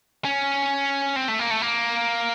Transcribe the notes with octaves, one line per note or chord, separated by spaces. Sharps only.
C#4
C4
A3
A#3
A3
A#3